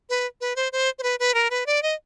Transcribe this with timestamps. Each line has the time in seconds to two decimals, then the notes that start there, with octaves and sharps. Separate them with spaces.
0.10 B4
0.41 B4
0.56 C5
0.72 C5
0.99 C5
1.03 B4
1.19 B4
1.34 A#4
1.50 B4
1.66 D5
1.83 D#5